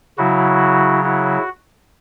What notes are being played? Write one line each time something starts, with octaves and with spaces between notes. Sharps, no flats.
C#3 F#3 E4 F#4
E4 F#4